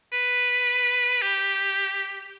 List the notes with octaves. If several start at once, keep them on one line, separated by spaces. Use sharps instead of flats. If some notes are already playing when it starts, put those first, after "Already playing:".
B4
G4